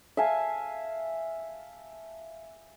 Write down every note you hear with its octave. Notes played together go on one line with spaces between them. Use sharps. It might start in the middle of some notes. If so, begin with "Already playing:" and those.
E5 F5 G#5 A5